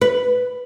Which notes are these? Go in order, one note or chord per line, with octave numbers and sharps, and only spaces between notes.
B4